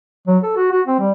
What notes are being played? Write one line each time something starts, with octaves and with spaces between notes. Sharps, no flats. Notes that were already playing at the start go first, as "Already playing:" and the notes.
F#3
A4
F#4
F#4
C4
G3